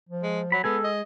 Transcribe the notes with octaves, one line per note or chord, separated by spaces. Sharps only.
F3
G#3
F#3 B5
G#3 B3 G#4 A4 G#5
D#5